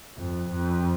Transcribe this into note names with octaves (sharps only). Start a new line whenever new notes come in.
F2
F2